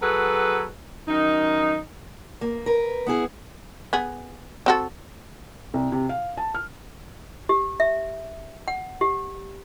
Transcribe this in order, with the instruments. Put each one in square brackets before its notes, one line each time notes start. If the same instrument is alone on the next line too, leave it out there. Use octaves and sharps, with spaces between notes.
[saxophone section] F#3 F#4 G#4 A4 B4
F#2 D#3 D#4
[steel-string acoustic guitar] A#3
A#4 B4
B3 E4 G#4
[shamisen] B3 G#4
C4 F#4 A4
[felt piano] C2
C3
F5
A5
F6
[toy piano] G4
E5
F#5
G4